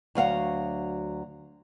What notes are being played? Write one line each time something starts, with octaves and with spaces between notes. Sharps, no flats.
D2 F#3 F5 F#5